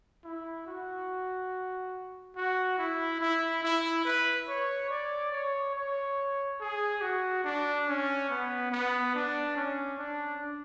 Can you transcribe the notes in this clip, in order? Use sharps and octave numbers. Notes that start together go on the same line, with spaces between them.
E4
F#4
F#4
E4
E4
E4
B4
C#5
D5
C#5
C#5
G#4
F#4
D4
C#4
B3
B3
D4
C#4
D4